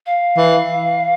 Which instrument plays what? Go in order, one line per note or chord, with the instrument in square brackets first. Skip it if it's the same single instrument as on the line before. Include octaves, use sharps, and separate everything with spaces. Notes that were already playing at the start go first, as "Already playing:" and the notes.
[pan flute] F5
[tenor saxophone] E3